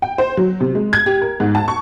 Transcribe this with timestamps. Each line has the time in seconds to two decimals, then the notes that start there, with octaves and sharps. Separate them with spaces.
0.02 G5
0.18 C5
0.37 F#3
0.60 C3
0.75 G#3
0.93 G#6
1.06 G4
1.22 A#4
1.40 G#2
1.55 A5
1.68 C#6